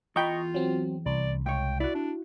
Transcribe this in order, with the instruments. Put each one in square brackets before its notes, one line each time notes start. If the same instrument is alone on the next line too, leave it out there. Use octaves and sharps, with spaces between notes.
[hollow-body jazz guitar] E2 G5 B5 [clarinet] F4 [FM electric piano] D#5 A#5 C#6
[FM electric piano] F#3 C4
[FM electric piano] C2 [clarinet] D5
[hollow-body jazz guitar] C#2 C#5 [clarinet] G5
[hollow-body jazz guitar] E4 F#4 [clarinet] D5
[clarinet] D4